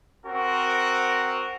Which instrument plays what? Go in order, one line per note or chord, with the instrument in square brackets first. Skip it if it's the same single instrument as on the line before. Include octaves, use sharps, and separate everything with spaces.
[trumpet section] C4 F#4 A#4